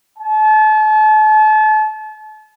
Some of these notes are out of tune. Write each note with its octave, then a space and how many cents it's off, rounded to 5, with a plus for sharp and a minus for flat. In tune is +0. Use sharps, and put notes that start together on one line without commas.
A5 -35